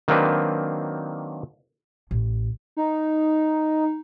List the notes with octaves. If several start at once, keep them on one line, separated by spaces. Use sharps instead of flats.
D#3 F#3 A#3 C4 D4 B4
A1
D#4